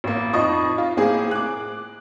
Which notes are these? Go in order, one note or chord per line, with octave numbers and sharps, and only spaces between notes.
A1 A#3
F2 D#4 D#5 C#6 D#6
F4
A2 A#3 C4 G#4
D6 F#6